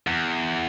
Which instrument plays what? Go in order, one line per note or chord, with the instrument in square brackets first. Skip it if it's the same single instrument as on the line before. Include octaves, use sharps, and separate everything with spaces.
[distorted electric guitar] E2